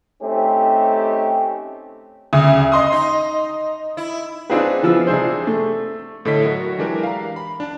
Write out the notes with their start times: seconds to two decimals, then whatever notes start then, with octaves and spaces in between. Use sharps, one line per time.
0.23 A3 C4 C#4 D#4 G4
2.33 D2 C#3 D#6
2.72 D#5 C6 D#6
2.92 D#4
3.97 E4
4.50 C4 D4 D#4 F4 G#4 B4
4.83 E3 F3 B3 E6
5.07 C3 D4 G#4 C5
5.47 A3
6.25 A2 D3 A4 C#5 D#5 B6
6.44 F#3 F#4 A#4
6.79 E3 G#3 D4 G4 A#4
7.03 F5 A#5
7.36 B5
7.60 D4 A5